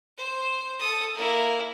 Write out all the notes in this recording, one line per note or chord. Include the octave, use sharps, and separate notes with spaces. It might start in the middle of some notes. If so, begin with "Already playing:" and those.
C5
A4 D#6
A#3 E4